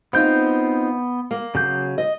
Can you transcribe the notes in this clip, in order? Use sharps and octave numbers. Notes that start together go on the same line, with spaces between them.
B3 C4 D#4 F4 G6
A#3
C#3 F#3 G6
D#5